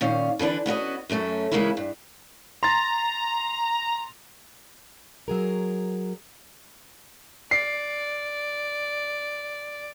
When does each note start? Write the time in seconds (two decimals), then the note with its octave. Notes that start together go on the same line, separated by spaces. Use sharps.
0.01 A#2 D#3 C#4 F5
0.39 D3 E3 D4 B4
0.66 B3 C#4 F#4 D#5
1.10 F#2 F#3 A3 C#4
1.52 C#3 E3 G#3 A#3 C#4 E4
1.77 G2
2.63 A#5 C6 A6
5.28 F#3 G#4 A#4
7.51 D5 C7